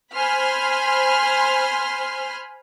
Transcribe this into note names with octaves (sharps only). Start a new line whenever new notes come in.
C5 G#5 B5 C6 F6